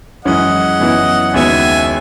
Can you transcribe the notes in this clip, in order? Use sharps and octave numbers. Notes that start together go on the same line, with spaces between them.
F#2 E3 G#3 C#4 D#5 F#5
F#2 E3 B3 E4
D#2 C#3 G#3 B3 F#4 E5 G#5